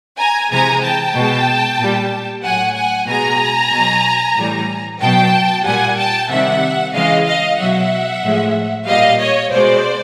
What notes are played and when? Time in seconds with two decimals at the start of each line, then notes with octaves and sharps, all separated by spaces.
0.18 G#5 A#5
0.50 C3 E3 G#3 G#5 A#5
0.83 G5 A5
1.14 B2 G#3
1.80 A#2 G3
2.43 A2 F#3 F#5 G#5
2.76 F#5 G#5
3.08 B2 G#3 G#5 A#5
3.72 B2 F#3
4.37 A2 E3 G3
5.01 B2 F#3 G5 A5
5.65 A#2 G3 F#5 G#5
5.97 G5 A5
6.30 C3 D#3 G3 E5 F#5
6.94 C#3 E3 G#3 D#5 F5
7.26 D#5 F5
7.58 B2 F#3 E5 F#5
8.23 A2 F3 G#3
8.87 A#2 G3 D#5 F5
9.19 C#5 D#5
9.51 B2 G#3 C5 D5